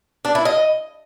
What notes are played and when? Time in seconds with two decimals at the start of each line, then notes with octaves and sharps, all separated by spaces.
0.25 D4
0.35 E4
0.45 D#5